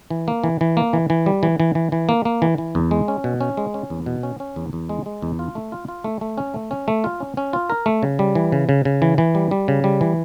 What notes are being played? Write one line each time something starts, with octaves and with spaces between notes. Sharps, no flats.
E3
A#3
E3
E3
A#3
E3
E3
G3
E3
E3
E3
E3
A#3
A#3
E3
E3
E2
G#3
C#4
B2
C#4
G#3
C#4
E2
B2
C#4
C#4
E2
E2
G#3
G#3
E2
F4
A3
F4
F4
A3
A3
C#4
A3
C#4
A3
F4
C#4
C#4
F4
A#4
A3
C#3
G3
E3
C#3
C#3
C#3
E3
E3
G3
G3
C#3
G3
E3